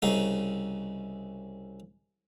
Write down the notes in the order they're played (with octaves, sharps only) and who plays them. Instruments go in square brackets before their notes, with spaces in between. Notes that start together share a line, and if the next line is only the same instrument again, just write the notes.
[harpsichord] C2 C#3 D#4